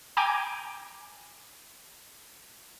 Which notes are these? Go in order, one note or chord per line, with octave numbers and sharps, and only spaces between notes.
G5 G#5 A#5 D6 G6 G#6